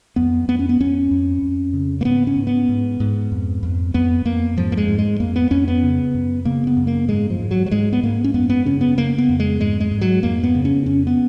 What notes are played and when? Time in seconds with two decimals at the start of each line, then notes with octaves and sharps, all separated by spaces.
0.16 F2 B3
0.48 F2 B3
0.59 C#4
0.69 B3
0.80 F2 C#4
1.11 F2
1.42 F2
1.73 C#3
2.01 A#3
2.05 G#2 B3
2.27 C#4
2.36 G#2
2.47 B3
2.69 G#2
3.00 G#2
3.32 F2
3.63 F2
3.94 F2 B3
4.25 F2 A#3
4.57 G#2 F3
4.72 A#3
4.77 G#3
4.88 G#2
4.99 G#3
5.20 F2 A#3
5.36 B3
5.51 F2 C#4
5.68 B3
5.83 C#3
6.15 F#2
6.45 C#3 A#3
6.67 B3
6.77 F#2
6.87 A#3
7.08 G#2 G#3
7.30 F3
7.39 G#2
7.51 F#3
7.66 F#3
7.71 G#2 G#3
7.93 B3
8.03 G#2 A#3
8.24 C#4
8.34 F#2 B3
8.50 B3
8.65 C#3 C#4
8.81 B3
8.97 C#3 A#3
9.18 B3
9.29 F2
9.40 G#3
9.60 G#2 G#3
9.80 G#3
9.91 G#2
10.01 F#3
10.23 F2 A#3
10.43 B3
10.55 C#3
10.65 C#4
10.86 F2 C#4
11.07 B3